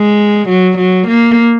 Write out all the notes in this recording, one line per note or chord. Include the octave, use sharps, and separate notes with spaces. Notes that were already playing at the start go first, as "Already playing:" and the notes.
Already playing: G#3
F#3
F#3
A#3